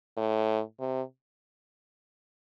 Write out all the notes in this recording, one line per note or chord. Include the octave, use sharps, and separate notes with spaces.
A2
C3